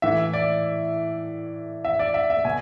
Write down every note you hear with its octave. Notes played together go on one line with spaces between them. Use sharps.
A2 E3 E5
D5
E5
D5
E5
E5
B2 G#5